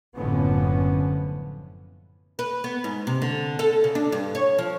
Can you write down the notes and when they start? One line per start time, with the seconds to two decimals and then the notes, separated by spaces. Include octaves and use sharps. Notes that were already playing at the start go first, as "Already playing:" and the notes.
0.17 F#1 A2 D3 F3 B3 C#4
2.39 B4
2.64 B3
2.84 G#2
3.07 C3
3.22 D3
3.59 A4
3.84 C#3
3.95 D4
4.12 G2
4.35 C#5
4.58 F3